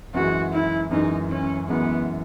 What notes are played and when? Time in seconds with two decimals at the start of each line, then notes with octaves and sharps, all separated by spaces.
0.14 F#2 E3 G#3 F#4
0.53 E4
0.91 F#2 E3 G#3 D#4
1.30 C#4
1.68 F#2 E3 G#3 B3